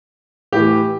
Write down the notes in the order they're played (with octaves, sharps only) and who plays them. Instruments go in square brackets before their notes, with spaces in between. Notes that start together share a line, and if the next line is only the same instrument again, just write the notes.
[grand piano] A2 E3 G4